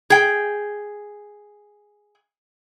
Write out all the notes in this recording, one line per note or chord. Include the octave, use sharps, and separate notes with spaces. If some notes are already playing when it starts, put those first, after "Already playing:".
G#4 G5